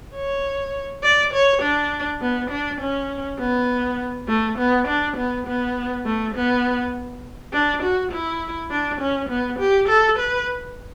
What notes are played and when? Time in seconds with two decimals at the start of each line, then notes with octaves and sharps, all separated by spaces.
0.15 C#5
1.03 D5
1.33 C#5
1.62 D4
2.21 B3
2.50 D4
2.81 C#4
3.39 B3
4.28 A3
4.58 B3
4.87 D4
5.17 B3
5.47 B3
6.05 A3
6.35 B3
7.53 D4
7.83 F#4
8.12 E4
8.71 D4
9.01 C#4
9.29 B3
9.59 G4
9.88 A4
10.19 B4